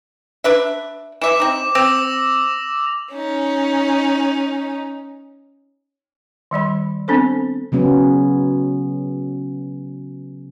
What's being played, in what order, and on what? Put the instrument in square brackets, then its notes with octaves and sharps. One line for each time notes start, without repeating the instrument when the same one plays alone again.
[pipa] D4 B4 E5
[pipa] E3 E5 [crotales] D6 E7
[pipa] C4 D#4
[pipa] C4 [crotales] E6 A#6 F7
[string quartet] C#4 D#4
[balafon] D#3 G3 D5 B5
B3 C4 D4 A4 C5
[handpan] C#3 F#3 B3 C#4